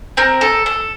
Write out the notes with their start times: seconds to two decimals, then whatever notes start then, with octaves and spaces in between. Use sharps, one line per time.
0.17 C4 A#4
0.41 A4
0.66 A4